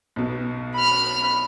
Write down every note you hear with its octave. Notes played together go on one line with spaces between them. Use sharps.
B1 B2
B5 F6